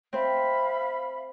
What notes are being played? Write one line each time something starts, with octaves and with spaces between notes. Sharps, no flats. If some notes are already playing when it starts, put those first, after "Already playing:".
C4 C5 E5 F5 B5